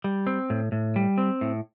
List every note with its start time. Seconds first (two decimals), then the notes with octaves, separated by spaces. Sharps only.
0.04 G3
0.27 C4
0.50 A2
0.72 A2
0.96 G3
1.18 C4
1.41 A2